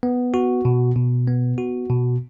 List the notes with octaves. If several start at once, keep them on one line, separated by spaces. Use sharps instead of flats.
B3
F#4
B2
B2
B3
F#4
B2